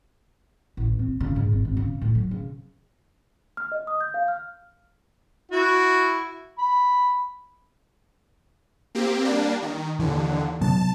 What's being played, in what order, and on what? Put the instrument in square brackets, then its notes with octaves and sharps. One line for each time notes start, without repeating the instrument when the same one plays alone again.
[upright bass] A1
C4
C#3
G#2
G#1
G#1
C#3
A2
F#3
C#3
[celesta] F6
D#5
D#6
G6
F5
F6
[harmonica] E4 F#4
B5
[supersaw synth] A#3 C4 G4
G3 A#3 D4
D#3
[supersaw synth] D#2 D3 [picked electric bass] E3
[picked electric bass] C3 F#3 B3 [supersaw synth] A5